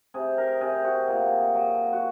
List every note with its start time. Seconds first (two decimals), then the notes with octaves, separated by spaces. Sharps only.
0.14 C3 G#4
0.38 A#4
0.61 C3 G#4
0.84 F#4
1.08 A#2
1.55 F#3
1.92 F#4